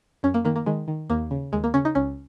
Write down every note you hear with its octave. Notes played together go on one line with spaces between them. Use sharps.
F#2 C#4
A#3
D#3 A#3
A#3
D#3 G#3
D#3
D#2 A#3
C#3
D#2 G#3
A#3
C#3 C#4
D#4
C#2 C#4